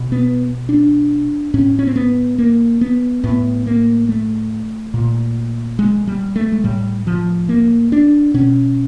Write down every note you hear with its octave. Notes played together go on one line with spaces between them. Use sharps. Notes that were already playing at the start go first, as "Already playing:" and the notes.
Already playing: B2
B3
D4
A2 C#4
C#4
C4
B3
A#3
B3
A2 B3
A#3
A3
A#2
G#3
G3
A3
G#3
A2 G3
F3
A#3
D4
B2 C#4